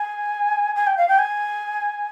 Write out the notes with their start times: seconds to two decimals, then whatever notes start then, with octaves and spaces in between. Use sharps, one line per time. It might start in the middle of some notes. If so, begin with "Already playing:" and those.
Already playing: G#5
0.75 G#5
0.86 G5
0.97 F5
1.08 G5
1.18 G#5